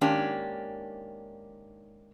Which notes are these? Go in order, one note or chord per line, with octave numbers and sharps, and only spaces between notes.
G#2 D#3 A#3 C#4 D4 G4